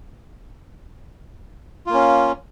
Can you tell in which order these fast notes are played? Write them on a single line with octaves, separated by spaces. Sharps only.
F4 A#3 C#4